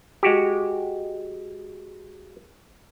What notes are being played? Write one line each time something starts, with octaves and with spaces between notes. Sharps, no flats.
G#3 F#4 G4